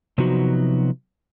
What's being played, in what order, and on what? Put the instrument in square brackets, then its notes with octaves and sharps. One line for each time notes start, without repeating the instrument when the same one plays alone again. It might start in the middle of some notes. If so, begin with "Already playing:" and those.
[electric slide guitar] C3 F3 F#3 B3 D#4 F#4